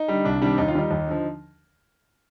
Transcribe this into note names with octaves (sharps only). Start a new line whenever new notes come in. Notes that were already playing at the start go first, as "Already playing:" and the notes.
Already playing: D#4
D3 G3
C2 D4
C3 D#3 G3 D4
D#2 D#4
F4
D#3 G3 D#4
D#2
D3 F3